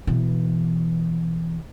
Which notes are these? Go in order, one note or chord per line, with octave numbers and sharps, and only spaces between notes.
B2 E3